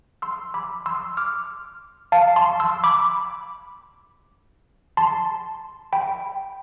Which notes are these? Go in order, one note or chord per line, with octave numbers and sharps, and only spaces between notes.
C6 E6
B5 D6
C6 E6
D6 F6
F5 A5
A5 C6
C6 E6
B5 D6
A5 C6
G5 B5